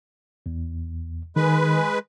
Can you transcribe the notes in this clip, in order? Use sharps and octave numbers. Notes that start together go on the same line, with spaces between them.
E2
D#3 G#3 B4